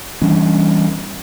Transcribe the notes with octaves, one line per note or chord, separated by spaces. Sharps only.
E3 G3 C#4 D4